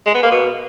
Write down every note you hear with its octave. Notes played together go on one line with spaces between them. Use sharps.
G#3
B3
A#3
B2